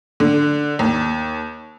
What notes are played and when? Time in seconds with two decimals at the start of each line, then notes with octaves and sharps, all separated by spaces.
0.20 D3
0.79 D#2